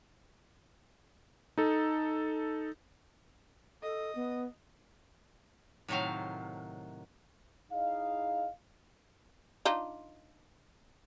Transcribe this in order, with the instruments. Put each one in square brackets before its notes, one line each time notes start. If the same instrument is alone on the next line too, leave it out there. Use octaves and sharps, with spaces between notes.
[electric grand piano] D#4 A4
[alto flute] A4 [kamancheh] D#5
[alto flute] B3
[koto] A2 C3 D#3 F#3 F5
[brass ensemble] D#4 E4 G#4 D#5 F5
[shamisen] D4 D#4 F4